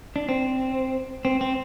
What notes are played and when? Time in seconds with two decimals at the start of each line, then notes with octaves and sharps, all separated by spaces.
0.16 D4
0.29 C4
1.25 C4
1.41 C4